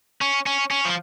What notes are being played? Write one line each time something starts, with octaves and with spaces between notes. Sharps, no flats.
C#4
C#4
C#4
F3